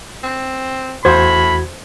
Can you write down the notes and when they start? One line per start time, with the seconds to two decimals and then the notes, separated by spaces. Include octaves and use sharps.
0.23 C4
1.05 E2 A2 F#4 C5 B5 G#6